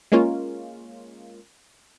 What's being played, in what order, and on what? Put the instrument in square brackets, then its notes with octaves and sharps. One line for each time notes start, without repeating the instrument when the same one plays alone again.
[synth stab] G#3 A#3 C#4 F4